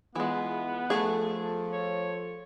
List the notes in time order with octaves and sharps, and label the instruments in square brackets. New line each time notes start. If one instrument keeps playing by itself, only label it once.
[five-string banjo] E3 G#3 [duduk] B3 [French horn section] E4 F4 G#4
[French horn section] F3 A4 [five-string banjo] A3 G#4
[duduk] C#5